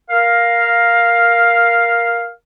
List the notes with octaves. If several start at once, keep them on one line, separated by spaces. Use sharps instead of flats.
A#4 F5